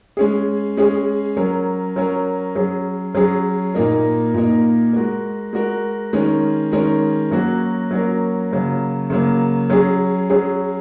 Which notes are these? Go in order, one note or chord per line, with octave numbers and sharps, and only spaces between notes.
G#3 C#4 G#4
G#3 C#4 G#4
F#3 C#4 A#4
F#3 C#4 A#4
F#3 C#4 G#4
F#3 C#4 G#4
A#2 A#3 D#4 A#4
A#2 A#3 D#4 A#4
G#3 F#4 A#4
G#3 F#4 A#4
D#3 G#3 C#4 A#4
D#3 G#3 C#4 A#4
F#3 A#3 C#4 F#4 A#4
F#3 A#3 C#4 F#4 A#4
C#3 F#3 A#3
C#3 F#3 A#3
F#3 C#4 G#4
F#3 C#4 G#4